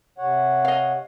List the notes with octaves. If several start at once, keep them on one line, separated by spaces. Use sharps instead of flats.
C3 C#5 F#5
D#5 F5